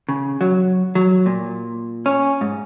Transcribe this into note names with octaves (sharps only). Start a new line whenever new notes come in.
C#3
F#3
F#3
A#2
C#4
G#2